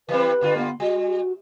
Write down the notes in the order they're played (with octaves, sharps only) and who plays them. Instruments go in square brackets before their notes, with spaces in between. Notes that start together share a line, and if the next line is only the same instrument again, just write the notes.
[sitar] E3 G3 C4 [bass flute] B4
[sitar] G2 D3 F4
[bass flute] B3
[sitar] G3 [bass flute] F#4